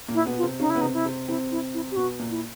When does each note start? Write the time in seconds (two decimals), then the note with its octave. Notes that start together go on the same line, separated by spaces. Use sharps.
0.08 A#2 A#3
0.14 E4
0.26 B2 B3
0.37 F4
0.43 C3 C4
0.60 C#3 C#4 D#4
0.70 E4
0.75 B3
0.81 C3 C4 D#4
0.94 E4
1.05 C3 C4
1.28 C3 C4 E4
1.51 E4
1.74 E4
1.91 G4
1.96 B2 B3 F#4
2.19 A#2 A#3
2.30 E4